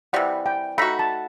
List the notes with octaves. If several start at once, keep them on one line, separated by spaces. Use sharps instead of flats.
C3 E3 G3 F#5
G5
A3 D#4 F#4 B5
A5